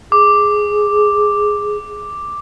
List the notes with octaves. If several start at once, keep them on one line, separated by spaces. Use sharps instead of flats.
G#4 D6